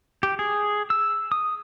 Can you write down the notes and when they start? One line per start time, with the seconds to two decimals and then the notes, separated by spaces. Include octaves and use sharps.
0.23 G4
0.39 G#4
0.90 E6
1.32 D#6